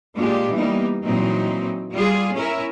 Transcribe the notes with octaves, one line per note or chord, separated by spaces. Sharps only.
A#2 G#3 D4 F4 G4
E3 G3 A#3 B3 D#4
A#2 E3 F#3 C4 D#4
G3 F4 G#4
C#4 E4 A#4 E5